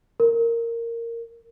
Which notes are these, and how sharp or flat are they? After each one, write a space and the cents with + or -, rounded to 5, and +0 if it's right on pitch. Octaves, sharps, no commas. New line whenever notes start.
A#4 -10